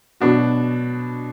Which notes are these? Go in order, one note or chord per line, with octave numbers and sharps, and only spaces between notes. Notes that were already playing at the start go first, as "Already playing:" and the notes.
B2 F#3 B3 D4 F#4